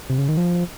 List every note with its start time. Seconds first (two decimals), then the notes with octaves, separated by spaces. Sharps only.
0.10 C3
0.18 C#3
0.29 D#3
0.37 F3